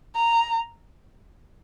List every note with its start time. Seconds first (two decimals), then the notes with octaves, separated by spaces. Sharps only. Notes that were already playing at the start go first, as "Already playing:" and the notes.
0.15 A#5